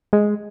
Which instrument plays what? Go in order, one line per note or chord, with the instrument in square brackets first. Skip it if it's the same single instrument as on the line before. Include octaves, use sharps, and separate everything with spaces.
[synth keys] G#3